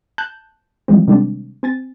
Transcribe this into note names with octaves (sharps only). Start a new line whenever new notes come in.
A5 F#6 G6
E3 F3 G3 G#3 C4
C3 D#3 G3 G#3 C4 D4
C4 G#5 A6